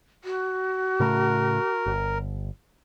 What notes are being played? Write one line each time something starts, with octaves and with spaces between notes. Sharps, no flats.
F#4
A2 C#3 A3 A#4
G1